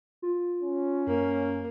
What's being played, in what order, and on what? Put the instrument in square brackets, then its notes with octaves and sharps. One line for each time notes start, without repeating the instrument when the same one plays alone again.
[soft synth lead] F4
[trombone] C#4
[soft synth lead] F#2 [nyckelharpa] A#3